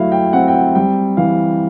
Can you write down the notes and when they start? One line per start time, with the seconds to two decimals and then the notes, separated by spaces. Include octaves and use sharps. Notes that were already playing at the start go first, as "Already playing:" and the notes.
Already playing: F#3 A3 E4 E5 F5
0.12 G5
0.33 C4 F#5
0.48 G5
0.54 F#5
0.75 G3 G5
1.17 E3 F5